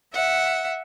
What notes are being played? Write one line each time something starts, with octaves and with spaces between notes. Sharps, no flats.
E5 F#5